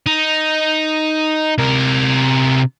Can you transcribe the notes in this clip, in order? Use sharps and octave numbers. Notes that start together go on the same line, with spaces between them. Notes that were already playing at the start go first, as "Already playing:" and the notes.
D#4
C3 A#4